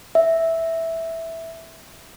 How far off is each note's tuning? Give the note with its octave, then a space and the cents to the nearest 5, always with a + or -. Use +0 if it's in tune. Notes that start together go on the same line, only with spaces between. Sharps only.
E5 -5